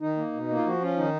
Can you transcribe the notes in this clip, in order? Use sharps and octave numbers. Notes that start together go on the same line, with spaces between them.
D#3 D#4
A#3
B2
A#3
F4
F3 F#4
C#4 F4
D#3 D#4